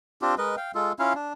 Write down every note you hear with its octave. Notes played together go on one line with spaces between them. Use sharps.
C4 D4 F4 G4
G#3 A#4 B4 D#5
F5 G5
G#3 F4 A4
C#4 E4 F4 F5
D4